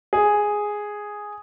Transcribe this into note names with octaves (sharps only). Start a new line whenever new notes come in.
G#4